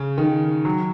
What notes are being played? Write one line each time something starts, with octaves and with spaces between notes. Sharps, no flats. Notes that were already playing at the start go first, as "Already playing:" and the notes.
Already playing: C#3
D#3
F#3